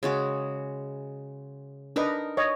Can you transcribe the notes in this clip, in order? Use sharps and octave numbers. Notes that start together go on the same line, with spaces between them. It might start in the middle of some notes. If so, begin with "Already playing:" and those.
C#3 G#3 F#4
D4 D#4 A#4 B4 D#5 A#5
C#5 D#5